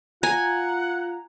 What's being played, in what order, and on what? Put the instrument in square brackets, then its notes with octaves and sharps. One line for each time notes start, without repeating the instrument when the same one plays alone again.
[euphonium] F4 [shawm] F#5 [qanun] G#5 [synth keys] A#5